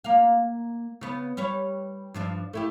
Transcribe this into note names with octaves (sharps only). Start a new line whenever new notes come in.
A#3 F5
C#3 B3
G3 B4 C#5
G2 F3 D4
A3 E4 G4